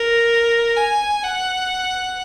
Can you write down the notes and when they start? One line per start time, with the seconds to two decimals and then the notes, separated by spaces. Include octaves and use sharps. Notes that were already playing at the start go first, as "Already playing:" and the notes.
Already playing: A#4
0.76 G#5
1.23 F#5